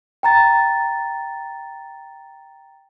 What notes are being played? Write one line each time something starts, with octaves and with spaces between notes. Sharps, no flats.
G5 A#5 A6